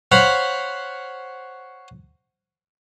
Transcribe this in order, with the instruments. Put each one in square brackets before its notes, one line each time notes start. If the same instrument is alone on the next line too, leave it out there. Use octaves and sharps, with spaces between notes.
[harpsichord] C5 C#5 F5 F#5 B5